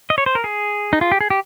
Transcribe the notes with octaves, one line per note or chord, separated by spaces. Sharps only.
D#5
C#5
C5
A#4
G#4
D#4
F4
G4
G#4
G4